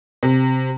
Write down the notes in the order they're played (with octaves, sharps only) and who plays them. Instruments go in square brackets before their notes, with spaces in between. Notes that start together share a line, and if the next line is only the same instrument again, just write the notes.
[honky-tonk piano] C3